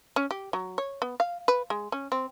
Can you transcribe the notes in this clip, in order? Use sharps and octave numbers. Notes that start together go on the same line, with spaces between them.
C#4
G4
F#3
C#5
B3
F5
B4
G#3
C#4
C4